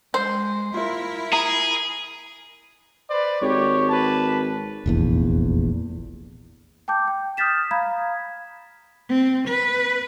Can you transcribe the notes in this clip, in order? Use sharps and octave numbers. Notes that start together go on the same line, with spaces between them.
G#3 C5
E4 F4 A#4 E5
G#4 A#5
B4 C5 D5
G#1 G4 C#5
B4 A5
F1 A#1 E2
G5 A5 D6 G6
G5
D#6 F6 G6 A6 B6 E7
F5 A#5 B5 G#6 B6
C4
B4